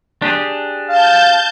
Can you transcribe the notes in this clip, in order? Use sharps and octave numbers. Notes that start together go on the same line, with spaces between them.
D4 G4 G#4
F5 A5 G6